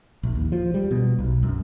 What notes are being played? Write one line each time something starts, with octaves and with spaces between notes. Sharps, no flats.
A#1
D#2
F3
G3
B2
B1
F#2